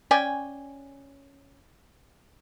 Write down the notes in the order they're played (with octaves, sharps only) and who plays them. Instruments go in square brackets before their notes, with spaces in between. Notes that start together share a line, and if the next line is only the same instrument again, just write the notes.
[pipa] C#4 D5 G5 G#5